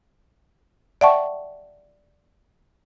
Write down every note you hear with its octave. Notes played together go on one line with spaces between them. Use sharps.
D5 E5 F#5 G5 A5 C#6